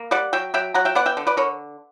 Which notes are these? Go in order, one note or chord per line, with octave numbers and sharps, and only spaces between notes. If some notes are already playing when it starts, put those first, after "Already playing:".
Already playing: A#3
G3 D5 F#5
F#3 E5 G5
F#3 E5 G5
F#3 F#5 A#5
E5 G5
B3 D5 F#5
E5 G5
D3
B4 D5
D3 A#4 C#5